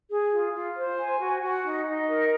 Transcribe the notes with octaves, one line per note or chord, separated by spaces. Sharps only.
G#4
F4
F4
C5
G#5
F#4
F#4
D#4
D#4
A#4